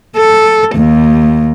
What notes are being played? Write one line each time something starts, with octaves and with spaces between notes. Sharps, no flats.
A4
D#2